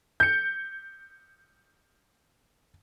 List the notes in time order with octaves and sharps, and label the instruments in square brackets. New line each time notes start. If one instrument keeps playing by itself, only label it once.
[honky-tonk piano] G6 C#7